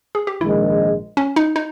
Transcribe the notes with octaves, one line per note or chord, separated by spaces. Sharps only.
G#4
G4
A#1 G#2 D#3 G#3 E4
C#4
D#4
D#4